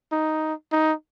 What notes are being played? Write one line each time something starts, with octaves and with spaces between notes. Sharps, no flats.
D#4
D#4